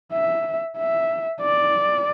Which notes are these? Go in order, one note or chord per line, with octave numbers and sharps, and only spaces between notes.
E5
E5
D5